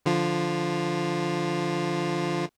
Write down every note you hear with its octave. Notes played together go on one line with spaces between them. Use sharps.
D3 F3 F4